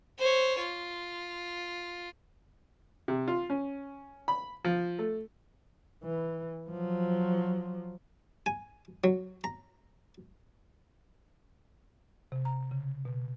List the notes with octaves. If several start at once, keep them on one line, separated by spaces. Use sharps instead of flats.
C5 C#5
F4
C3
F4
C#4
B5
F3
A3
E3
F3 F#3
G#5
F#3
A#5
C3
A#5
C#3
B2